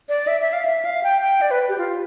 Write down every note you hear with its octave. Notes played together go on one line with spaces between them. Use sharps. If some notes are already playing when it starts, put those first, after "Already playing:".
D5
E5
E5
F5
E5
F5
G5
G5
D5
B4
G4
F4